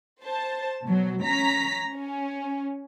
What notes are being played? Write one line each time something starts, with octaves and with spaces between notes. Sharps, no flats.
C5 A5
B2 F#3
C#4 A#5 B6
C#4